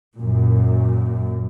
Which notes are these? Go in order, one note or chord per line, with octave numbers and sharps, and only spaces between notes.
F#2 A#2